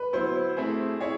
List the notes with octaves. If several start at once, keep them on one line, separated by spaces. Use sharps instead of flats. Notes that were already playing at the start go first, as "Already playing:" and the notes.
Already playing: B4
F#3 B3 E4 C5
A3 C4 E4 G#4
E4 G#4 C#5